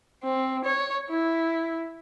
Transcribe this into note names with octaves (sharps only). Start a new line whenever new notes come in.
C4
C#5
E4